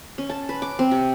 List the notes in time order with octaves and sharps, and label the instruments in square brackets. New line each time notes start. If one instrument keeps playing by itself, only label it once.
[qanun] C#4
A5
B4
D6
C4
C3